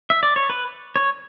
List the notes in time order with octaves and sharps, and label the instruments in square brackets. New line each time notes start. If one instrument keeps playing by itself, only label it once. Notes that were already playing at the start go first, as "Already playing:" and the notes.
[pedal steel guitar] E5
D5
C#5
B4
C#5